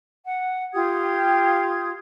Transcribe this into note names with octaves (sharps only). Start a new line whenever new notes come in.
F#5
F4 G4 D#6 G#6